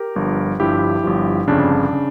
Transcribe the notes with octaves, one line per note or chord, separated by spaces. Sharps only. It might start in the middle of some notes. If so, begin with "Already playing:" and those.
Already playing: G4 A#4
G1 G2 F3
G1 G2 F3 E4 G4
G1 G2 F3
G1 F2 C#3 D4
C#3